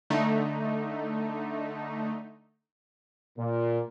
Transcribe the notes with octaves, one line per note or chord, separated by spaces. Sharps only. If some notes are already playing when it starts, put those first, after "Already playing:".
D3 A3 D#4
A#2